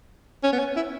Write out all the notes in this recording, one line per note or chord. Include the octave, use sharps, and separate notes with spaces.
C#4
B3
C#4
E4